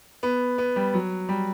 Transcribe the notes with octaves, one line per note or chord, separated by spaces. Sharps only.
B3
B3
G3
F#3
G3